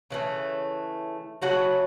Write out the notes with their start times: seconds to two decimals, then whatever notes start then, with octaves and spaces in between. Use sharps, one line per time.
0.11 C#3 E3 A3
1.42 C#3 F#3 A3 F#4 F#5